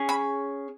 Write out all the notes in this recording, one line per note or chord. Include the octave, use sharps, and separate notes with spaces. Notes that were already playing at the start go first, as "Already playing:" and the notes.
Already playing: C#4 G#4
B5